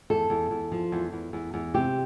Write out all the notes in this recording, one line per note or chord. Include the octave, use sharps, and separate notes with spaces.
E2 A4
E2
E2
F3
E2
E2
E2
E2
C3 G4